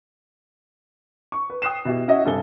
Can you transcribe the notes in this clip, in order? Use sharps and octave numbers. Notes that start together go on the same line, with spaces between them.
C#6
B4
G5 D#6 F#6 C7 E7
B2 E4 G4
C#4 E4 F#4 D#5 E5 F#5
G2 C3 A4 G#5 G7